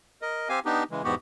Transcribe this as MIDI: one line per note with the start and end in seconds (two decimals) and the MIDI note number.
0.22 0.49 70
0.22 0.49 75
0.49 0.60 60
0.49 0.60 67
0.49 0.60 77
0.49 0.60 80
0.65 0.83 59
0.65 0.83 62
0.65 0.83 63
0.65 0.83 67
0.91 1.02 49
0.91 1.02 52
0.91 1.02 56
1.04 1.15 40
1.04 1.15 44
1.04 1.15 47
1.04 1.15 59
1.04 1.15 66
1.04 1.15 67